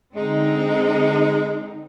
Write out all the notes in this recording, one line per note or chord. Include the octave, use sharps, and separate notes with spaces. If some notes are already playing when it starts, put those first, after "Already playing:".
D3 G#3 C4 D#4